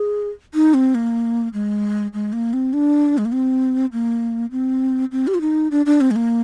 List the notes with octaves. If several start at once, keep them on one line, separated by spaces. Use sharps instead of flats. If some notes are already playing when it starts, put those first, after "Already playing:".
Already playing: G#4
D#4
C4
A#3
G#3
G#3
A#3
C4
D4
G#3
A#3
C4
A#3
C4
C4
G4
F4
D#4
D4
D4
C4
G#3
A#3